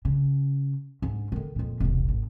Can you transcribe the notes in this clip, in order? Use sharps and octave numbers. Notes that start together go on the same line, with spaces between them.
C#3
G#2 D4
D3 D#3
F2 A#2
E1 C2
G#1